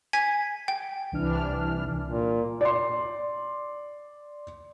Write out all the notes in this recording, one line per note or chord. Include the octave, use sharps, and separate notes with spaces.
G#5 G#6 B6
G5
C2 E3 D4 F6
A#2
D5 C6